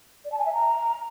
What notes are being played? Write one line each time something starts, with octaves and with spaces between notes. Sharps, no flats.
D5
A5
G#5
E5
A#5